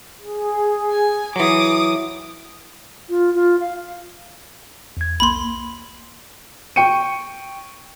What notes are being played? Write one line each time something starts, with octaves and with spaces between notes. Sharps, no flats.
G#4
G#5
E3 F#3 D6 D#6
F4
F4
F5
E2 G#6
B1 A#3 B5 C6
G5 C#6 C#7 D#7